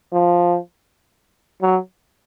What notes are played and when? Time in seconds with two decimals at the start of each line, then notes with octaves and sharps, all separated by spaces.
0.13 F3
1.62 F#3